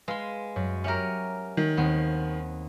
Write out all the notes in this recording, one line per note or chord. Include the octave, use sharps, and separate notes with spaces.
G#3 B4 F5 C6
F#2
C#4 G4 A#4 E5 F#5
D#3
D#2 B3 C4